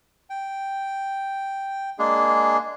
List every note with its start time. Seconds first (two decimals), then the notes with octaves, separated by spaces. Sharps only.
0.30 G5
1.99 G#3 A#3 D4 G#4